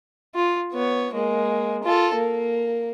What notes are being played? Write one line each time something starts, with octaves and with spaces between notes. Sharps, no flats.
F4
B3 C#5
G#3 A#3
F4 A4
A#3